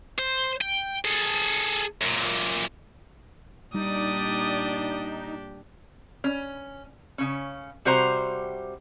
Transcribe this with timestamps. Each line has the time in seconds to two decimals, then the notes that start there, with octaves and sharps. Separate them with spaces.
0.19 C5
0.61 G5
1.05 G#4 A4
2.01 F#2 A#2
3.74 A#2 G3 D4 D#4 G4 D5 D#6
6.24 C#4
7.18 C#3 C#4
7.85 C3 G3 F#4 C5 A#5